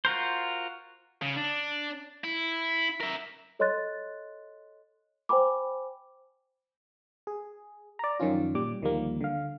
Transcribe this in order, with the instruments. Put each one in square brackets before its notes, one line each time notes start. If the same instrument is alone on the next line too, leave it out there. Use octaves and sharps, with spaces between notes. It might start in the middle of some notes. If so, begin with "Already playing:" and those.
[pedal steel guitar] F4 F#4 A#4 C5
[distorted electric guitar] C#3
D4
E4
A#4 E5
[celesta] A4 C#5 D#5 C6 F#6 A6
C5 G5 G#5 B5 D6
[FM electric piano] G#4
D5 A#5
F#2 D#3 F3 C#4 F4
A#2 G3 D6
D2 D#3 F3 G3 A#3
D3 F5